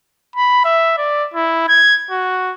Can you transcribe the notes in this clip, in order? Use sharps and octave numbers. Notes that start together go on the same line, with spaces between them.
B5
E5
D5
E4
G#6
F#4